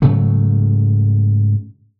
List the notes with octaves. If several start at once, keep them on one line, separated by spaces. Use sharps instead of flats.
G#2 C#3 F#3 A3